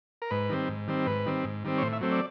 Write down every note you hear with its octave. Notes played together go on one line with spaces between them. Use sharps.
A#4
G#2 B4
D#3 G3 C4
G#2
D#3 G3 C4
G#2 B4
D#3 G3 C4
G#2
D#3 G3 C4
C#5
A2 C5
E5
F#3 A3 C4
D5